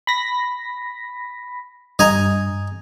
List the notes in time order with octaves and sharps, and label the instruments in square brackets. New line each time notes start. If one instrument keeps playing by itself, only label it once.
[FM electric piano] B5 A#6 B6
[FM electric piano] G2 [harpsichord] D#5 G#5 A#5